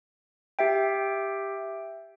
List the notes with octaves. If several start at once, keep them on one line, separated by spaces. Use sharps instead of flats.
G4 E5 G5